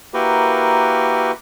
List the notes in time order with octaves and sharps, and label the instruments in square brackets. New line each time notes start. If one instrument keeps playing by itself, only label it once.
[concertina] A#3 E4 F#4 G4 A#4 B4